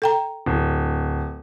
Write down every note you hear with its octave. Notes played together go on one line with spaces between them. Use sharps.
A4 G5 A#5
D1